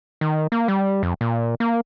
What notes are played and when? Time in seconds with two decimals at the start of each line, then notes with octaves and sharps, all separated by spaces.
0.21 D#3
0.52 A#3
0.68 G3
1.03 F2
1.21 A#2
1.60 A#3